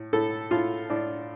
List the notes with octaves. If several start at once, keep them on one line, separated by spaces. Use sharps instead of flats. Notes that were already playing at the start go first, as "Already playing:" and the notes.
Already playing: A2
A2 A4
A2 F4
A2 D4